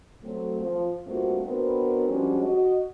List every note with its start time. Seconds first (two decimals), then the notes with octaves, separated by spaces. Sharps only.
0.23 F#3 A3 C4
0.60 F3
1.07 G2 A3 A#3 C4 F4 F#4
1.44 B3 C4 D4 F#4 A#4 B4
2.07 F3 G3 G#3 C#4 D4 F#4
2.43 F#4 D#5